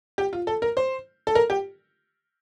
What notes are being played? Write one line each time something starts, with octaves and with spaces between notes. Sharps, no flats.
G4
F4
A4
A#4
C5
A4
A#4
G4